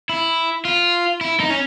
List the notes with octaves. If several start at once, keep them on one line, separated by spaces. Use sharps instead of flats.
E4
F4
E4
D#4
C#4